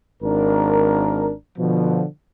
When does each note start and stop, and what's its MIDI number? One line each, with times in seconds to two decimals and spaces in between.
0.23 1.33 32
0.23 1.33 62
0.23 1.33 70
1.59 2.03 47
1.59 2.03 50
1.59 2.03 53